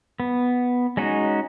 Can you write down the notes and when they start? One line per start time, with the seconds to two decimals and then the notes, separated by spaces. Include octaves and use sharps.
0.20 B3
0.97 G#3 C#4 D#4 F#4